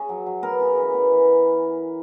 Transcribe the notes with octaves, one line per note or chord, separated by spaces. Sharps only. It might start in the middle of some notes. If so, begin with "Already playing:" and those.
Already playing: C#3 C#4 G#4
F#3
F#3
B3 A#4
C#3
E3
B3
E3